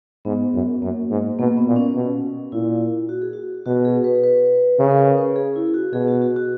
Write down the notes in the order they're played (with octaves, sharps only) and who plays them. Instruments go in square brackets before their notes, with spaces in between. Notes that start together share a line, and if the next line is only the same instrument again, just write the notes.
[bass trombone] G#2 [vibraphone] B3
[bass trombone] F#2
[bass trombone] F#2 [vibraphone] A#3
[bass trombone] G#2
[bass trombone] B2 [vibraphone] A#3
[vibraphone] B3
[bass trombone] A#2
[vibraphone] C#4
[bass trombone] B2
[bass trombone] A#2 [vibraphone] E4
[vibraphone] F#4
G#4
F#4
[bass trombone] B2 [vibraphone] F#4
[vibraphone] G#4
B4
B4
[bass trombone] C#3 [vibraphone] C#5
[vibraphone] A#4
B4
B4
G#4
E4
F#4
[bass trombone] B2 [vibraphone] G#4
[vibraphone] F#4
F#4
F#4